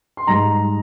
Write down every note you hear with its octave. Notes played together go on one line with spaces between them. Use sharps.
C6
G#2 G3 A#5